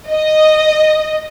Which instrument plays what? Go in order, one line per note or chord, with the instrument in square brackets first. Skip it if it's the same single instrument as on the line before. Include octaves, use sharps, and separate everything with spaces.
[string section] D#5